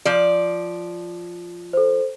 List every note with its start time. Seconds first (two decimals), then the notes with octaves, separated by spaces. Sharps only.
0.05 F3 D5
1.73 A4 C5